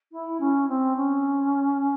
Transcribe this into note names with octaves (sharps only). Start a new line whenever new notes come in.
E4
C#4
C4
C#4